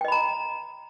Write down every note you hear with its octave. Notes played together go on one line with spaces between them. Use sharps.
D#5 G5 A#5 B5